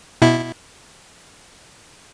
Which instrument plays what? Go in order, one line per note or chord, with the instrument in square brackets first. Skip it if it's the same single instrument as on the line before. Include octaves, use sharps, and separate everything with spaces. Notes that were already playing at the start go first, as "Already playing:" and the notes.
[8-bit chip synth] B2 E4